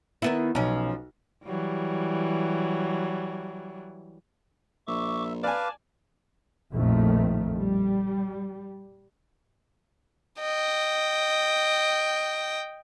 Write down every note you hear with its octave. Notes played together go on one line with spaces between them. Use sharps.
D#3 B3 E4
B1 F3 C#4
E3 F#3 G3
A#1 E5 C#6 D6
B4 D5 F5 G#5 A5 D6
A#1 F2 A2 D#3 A3
G3
D#5 G5